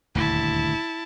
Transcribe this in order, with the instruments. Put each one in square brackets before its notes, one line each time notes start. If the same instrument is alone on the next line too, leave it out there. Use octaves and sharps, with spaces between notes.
[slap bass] D#1 D2 G2 [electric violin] E4 A5